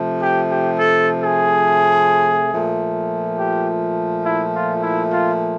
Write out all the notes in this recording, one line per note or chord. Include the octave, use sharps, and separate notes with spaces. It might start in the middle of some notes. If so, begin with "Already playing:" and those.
Already playing: C3 F3 A3
G4
G4
A4
G#4
A#2 F3 A3
G4
E4
F4
E4
F4